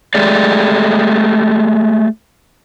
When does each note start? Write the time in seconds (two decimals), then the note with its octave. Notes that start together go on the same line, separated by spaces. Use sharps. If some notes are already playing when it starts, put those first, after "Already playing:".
0.15 G#3 A3 G4 G#4 D5